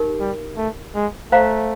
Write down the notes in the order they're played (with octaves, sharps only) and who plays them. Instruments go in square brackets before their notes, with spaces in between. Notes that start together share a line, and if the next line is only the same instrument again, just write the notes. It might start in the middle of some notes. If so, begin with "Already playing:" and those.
Already playing: [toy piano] D#4 G4 A#4
[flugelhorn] G3
A3
G#3
[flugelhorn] A3 [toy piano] C5 F5 A#5